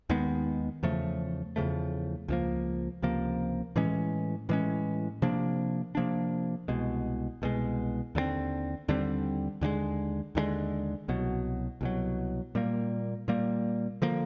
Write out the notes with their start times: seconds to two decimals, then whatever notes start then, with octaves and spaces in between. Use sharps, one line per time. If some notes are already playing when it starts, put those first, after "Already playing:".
0.09 D#2 D#3 G#3 B3
0.83 E2 C#3 F3 A3
1.56 E2 C#3 F3 A3
2.28 C#2 C3 F3 A#3
3.02 C#2 C3 F3 A#3
3.76 A2 E3 G#3 C#4
4.49 A2 E3 G#3 C#4
5.22 C3 F3 A#3 D4
5.95 C3 F3 A#3 D4
6.68 C2 B2 G#3
7.42 C2 B2 G#3
8.15 D#2 D3 G3 C4
8.88 D#2 D3 G3 C4
9.61 D#2 D3 F3 G#3
10.35 D#2 D3 F3 G#3
11.08 C2 B2 F#3
11.81 C2 B2 F#3
12.55 A#2 G3 A#3
13.28 A#2 G3 A#3
14.02 D3 F3 A#3